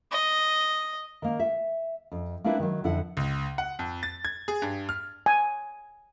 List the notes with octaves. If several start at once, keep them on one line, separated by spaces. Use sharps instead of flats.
D#5
D#3 A#3
E5
F2
A#3 C4 D4 E4 B4
D#3 F#3
F2 D3 E4 F#5
C#2
F#5
F2
A6
G#6
G#4
G2
F6
G#5